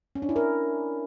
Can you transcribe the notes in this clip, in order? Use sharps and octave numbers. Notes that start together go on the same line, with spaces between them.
C#4
D4
E4
A#4